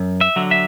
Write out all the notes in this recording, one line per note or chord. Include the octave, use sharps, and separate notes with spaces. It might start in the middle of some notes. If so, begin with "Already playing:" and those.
Already playing: F#2
E5
D3 F#3
E5